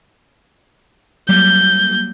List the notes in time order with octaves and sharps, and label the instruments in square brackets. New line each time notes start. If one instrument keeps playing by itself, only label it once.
[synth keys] F#3 G3 A#3 [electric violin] G6